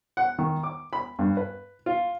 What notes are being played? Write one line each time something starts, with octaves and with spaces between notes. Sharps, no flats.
F#5
D#3
D6
B5
G2
B4
F4